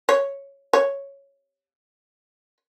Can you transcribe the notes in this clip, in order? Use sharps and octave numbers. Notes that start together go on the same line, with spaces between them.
C#5
C#5